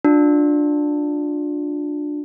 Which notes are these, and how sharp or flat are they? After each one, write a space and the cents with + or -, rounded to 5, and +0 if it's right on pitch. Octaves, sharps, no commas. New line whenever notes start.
D4 +5 F4 +35